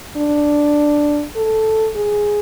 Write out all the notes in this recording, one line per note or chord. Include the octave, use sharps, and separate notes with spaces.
D4
A4
G#4